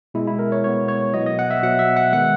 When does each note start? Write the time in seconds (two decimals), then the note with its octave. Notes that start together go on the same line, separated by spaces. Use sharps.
0.14 B2 G#3 B3 E4
0.27 E4
0.39 A#4
0.52 C#5
0.64 B2 G#3 B3 C#5
0.88 C#5
1.14 B2 F#3 B3 D#5
1.26 D#5
1.39 F#5
1.51 E5
1.62 B2 F#3 B3 F#5
1.79 E5
1.97 F#5
2.12 D#3 G#3 B3 F#5